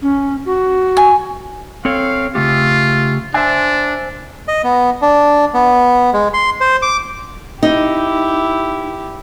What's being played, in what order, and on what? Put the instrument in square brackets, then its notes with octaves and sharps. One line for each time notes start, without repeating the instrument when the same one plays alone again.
[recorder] C#4
F#4
[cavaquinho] G#5
[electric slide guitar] C4 A4 C#5 [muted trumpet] F5
[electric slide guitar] C#3 A3 G4 [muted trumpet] F4
[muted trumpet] D4 [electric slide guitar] C5 E5 G#5
[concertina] D#5
B3
D4
B3
G#3
C6
C5
D6
[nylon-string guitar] D#4 [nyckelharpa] E4 G4